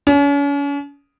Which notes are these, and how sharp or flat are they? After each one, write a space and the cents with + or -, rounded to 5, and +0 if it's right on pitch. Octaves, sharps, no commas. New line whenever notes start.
C#4 +40